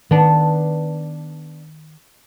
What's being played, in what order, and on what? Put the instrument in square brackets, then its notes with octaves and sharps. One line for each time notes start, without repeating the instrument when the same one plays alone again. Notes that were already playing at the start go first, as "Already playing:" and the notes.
[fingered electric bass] D#3 [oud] B3 D4